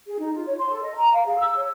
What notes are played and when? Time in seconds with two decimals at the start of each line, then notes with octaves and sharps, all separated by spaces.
0.07 G#4
0.19 D#4
0.33 F4
0.46 C#5
0.58 C6
0.69 A4
0.83 D#5
0.94 A#5
1.12 F5
1.26 G#4
1.37 E6
1.56 C#5